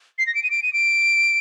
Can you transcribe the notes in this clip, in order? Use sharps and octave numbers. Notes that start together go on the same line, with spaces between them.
C7
A#6
D7
D#7
D7
D#7
D7